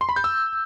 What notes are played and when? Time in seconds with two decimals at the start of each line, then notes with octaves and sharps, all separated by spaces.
0.01 C6
0.09 B5
0.16 G6
0.24 E6